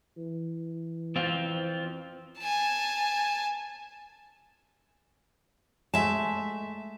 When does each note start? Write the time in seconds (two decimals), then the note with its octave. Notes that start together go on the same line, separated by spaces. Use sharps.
0.17 E3
1.16 C4 F4
2.39 G#5 A5
5.94 G#3 A3 E5 A5